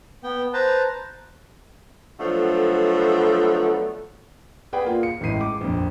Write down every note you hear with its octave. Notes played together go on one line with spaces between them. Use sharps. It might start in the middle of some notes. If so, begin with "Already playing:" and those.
B3 G5
B4 C5 A5 A#5
D3 F3 F#3 A3 B3
G#4 B4 D5 F#5 G5
A#3 F4
C#7
A1 A2 G#3 C7 D#7
D6
A#1 F2